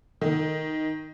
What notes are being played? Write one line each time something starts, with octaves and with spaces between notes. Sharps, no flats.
D#3